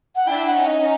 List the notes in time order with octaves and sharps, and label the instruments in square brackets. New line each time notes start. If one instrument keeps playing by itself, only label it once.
[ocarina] F#5
[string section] D4 E4 [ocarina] G5
[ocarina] F#5
[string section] C#4 D#4
[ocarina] D#5